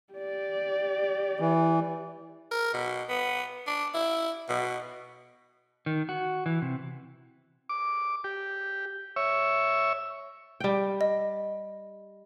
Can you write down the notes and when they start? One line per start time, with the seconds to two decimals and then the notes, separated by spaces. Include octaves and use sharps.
0.13 G4 D5
1.40 E3
2.51 A#4
2.73 B2
3.09 B3
3.67 D4
3.94 E4
4.49 B2
5.86 D#3
6.09 F#4
6.46 E3
6.62 C3
7.69 D6
8.24 G4
9.16 C#5 E5
10.60 G3 G5
11.01 D#5